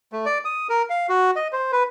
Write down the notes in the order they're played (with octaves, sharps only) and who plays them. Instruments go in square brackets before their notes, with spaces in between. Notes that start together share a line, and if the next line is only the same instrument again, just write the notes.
[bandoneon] A3
D5
D#6
A#4
F5
F#4
D#5
C5
B4